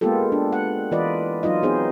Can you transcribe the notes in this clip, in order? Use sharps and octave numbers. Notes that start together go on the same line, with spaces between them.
G#3 A#3 B3 F4 G4 A4
D4
F#5
E3 F4 B4 D5 D#5
F#3 D#4 F4 D#5
B3 C4 D#4 G#4 C5